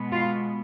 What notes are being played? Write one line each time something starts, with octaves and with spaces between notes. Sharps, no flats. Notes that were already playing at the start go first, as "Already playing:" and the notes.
Already playing: B2 G#3 B3
F4